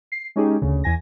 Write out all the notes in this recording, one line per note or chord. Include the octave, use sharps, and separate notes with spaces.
C7
G#3 C#4 D#4 G4 G#4
D2 C#3
E2 G#5 A#6